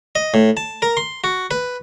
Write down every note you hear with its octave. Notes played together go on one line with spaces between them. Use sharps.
D#5
A2
A5
A#4
C6
F#4
B4